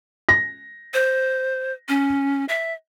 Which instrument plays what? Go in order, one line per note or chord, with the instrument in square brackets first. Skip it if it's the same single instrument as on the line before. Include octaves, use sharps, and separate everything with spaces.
[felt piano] A#6
[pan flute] C5
C#4
E5